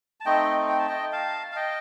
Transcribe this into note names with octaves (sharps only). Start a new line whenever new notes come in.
A5
A3 C4 D#4 D#5 G5
G5
A5
D#5 G5
F5 A5
F5
D#5 G5